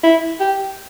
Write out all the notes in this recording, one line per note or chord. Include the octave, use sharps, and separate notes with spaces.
E4
G4